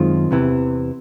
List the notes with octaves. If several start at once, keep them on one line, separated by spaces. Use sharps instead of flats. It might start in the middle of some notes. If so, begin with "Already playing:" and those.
Already playing: F#2 D#3 G#3 C4 F4
E2 C3 E3